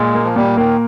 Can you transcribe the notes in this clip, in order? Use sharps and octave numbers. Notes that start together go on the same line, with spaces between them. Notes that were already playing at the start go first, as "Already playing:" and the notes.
Already playing: A#2 G#3
A#3
F3
A#2 G3
D#3 A#3